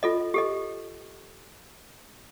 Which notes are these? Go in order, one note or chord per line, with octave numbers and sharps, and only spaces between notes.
F4 A4 D#5
G4 A4 D#5